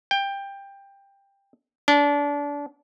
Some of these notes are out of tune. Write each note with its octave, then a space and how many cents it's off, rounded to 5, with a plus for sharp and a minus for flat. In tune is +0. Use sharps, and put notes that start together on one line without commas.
G5 +15
D4 -25